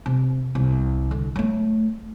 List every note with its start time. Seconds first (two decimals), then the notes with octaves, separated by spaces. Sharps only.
0.06 C3
0.55 C2
1.11 D3
1.36 F#3 A3